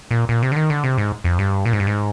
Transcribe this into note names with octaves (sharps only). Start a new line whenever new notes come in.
A#2
A#2
C3
D3
D#3
D3
C3
G#2
F2
G2
A#2
G#2
G2
G#2